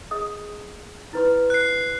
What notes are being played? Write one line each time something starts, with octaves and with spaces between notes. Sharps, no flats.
G#4 D#5 D#6
E4 B4 C6
F#6 C7